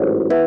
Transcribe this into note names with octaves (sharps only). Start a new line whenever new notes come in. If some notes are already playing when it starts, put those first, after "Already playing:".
Already playing: A1 G#2 F#3
E3 B3 E4